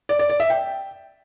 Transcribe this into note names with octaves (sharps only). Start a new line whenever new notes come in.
D5
D5
D5
E5
G5